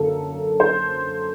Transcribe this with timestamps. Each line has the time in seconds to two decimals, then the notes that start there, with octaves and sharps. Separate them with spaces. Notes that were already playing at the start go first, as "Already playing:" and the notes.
Already playing: F#2 D3 F#3 A#3 A4
0.60 C5